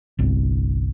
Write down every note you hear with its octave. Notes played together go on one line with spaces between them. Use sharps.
G1 C2